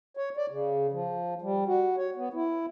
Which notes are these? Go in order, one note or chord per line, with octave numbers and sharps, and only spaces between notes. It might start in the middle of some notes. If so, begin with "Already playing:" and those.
C#5
D5
C#3
F3
G3
F#4
C#5
B3
E4